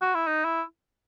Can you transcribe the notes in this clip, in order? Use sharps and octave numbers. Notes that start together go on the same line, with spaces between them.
F#4
E4
D#4
E4